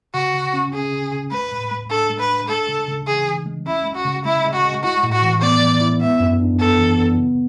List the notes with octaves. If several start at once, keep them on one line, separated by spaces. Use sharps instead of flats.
C#3 F#4
C#3
C#4
C#4 G#4
C#3
C#3
G#3 B4
A2
G#3
D4 A4
G#3
B4
D4
G#3 A4
C#3
C#3
E3 G#4
E3
G#3
C#4 E4
G#3
F#4
C#3
G#3 E4
G#3
F#4
G#3
E4 F#4
A2
F#4
E3
B3 D5
E3
E4
B3 E5
F#2
D4
B3 A4
E3
B3
C#3